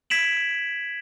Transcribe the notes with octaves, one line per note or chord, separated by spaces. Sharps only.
G#6 B6 D7 E7 F#7